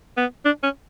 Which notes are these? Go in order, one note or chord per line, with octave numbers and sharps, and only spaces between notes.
B3
D4
C#4